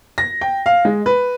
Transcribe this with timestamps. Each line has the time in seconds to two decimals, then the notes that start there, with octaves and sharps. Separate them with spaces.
0.18 A#6
0.41 G5
0.66 F5
0.85 G#3
1.06 B4